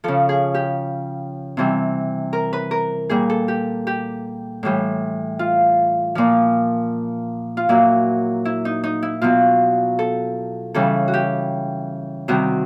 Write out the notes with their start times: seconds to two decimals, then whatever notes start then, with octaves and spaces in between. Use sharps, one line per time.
0.04 C#3 F3 A4
0.29 G#4
0.54 G4
1.57 C3 E3 G3
2.33 A#4
2.53 B4
2.71 A#4
3.09 A#2 G3 G#4
3.30 A4
3.48 G4
3.87 G4
4.63 A2 E3 G3
5.39 F4
6.15 A#2 F3
7.57 F4
7.69 A#2 F#3 E4
8.45 E4
8.65 D#4
8.84 D#4
9.03 E4
9.22 B2 F#3 F4
9.99 A4
10.74 C#3 E3 G3 A4
11.08 F#4
11.14 G4
12.28 C3 D#3 G3 F#4